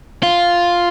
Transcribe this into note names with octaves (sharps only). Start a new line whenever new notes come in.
F4